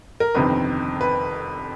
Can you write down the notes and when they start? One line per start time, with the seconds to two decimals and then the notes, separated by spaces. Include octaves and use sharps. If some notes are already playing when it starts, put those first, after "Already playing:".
0.20 A#4
0.35 G1 F2 C3 D#3 B4
1.01 B4